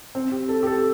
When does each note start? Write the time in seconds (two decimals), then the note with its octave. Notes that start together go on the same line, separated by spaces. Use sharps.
0.15 C4
0.31 G4
0.49 A4
0.63 G4
0.66 A4